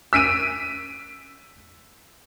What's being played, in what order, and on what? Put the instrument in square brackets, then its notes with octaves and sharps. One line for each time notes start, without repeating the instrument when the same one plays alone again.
[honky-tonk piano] E6 B6 D7 D#7